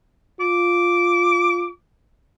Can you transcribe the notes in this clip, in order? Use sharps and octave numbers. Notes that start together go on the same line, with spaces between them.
F4 D6